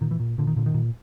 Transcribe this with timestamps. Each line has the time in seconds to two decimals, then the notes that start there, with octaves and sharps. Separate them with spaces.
0.01 A#2 D#3
0.11 E3
0.20 A#2
0.38 A#2 D3
0.47 D#3
0.56 A#2 D3
0.66 D#3
0.74 A#2